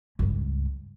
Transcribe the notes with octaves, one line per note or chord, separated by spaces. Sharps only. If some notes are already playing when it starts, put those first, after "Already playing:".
C#2 G2